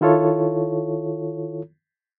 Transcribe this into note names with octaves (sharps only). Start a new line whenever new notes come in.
D#3 E4 F4 A4 C#5